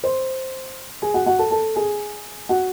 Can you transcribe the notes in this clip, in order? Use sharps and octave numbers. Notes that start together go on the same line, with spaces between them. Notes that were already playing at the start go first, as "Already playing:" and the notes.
C5 C6
G#4 G#5
F#4 F#5
F#4 F#5
A4 A5
A4 A5
G#4 G#5
F#4 F#5